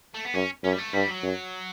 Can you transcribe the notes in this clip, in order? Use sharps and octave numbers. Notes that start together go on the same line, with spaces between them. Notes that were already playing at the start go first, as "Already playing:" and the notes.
A3
B3
F#2 C#4
F#2 C#4
G3
A3
G2 G3
F#3
F#2